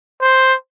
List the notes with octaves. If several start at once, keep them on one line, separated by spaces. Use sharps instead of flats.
C5